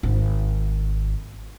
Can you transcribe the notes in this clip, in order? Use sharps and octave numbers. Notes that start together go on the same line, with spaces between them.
G#1